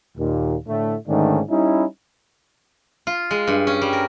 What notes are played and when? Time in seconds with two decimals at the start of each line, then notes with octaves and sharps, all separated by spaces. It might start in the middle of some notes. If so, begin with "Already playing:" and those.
0.17 D#2 A#2
0.66 A2 D3 A3
1.08 G#2 D3 D#3 A3 C#4 D4
1.49 G3 C#4 D#4 E4
3.07 F4
3.31 G#3
3.48 G2
3.67 C#4
3.82 G3
3.93 A#4